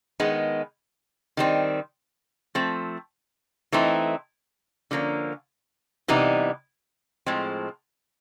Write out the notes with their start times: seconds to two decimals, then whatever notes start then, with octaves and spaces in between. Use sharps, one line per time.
0.20 D#3 G#3 B3
1.37 D#3 G3 C4
2.55 F3 A3 C4
3.72 E3 A3 C4 D#4
4.91 D3 F3 A#3 C#4
6.08 C3 E3 G3 B3 D#4
7.26 A2 F3 G#3 C4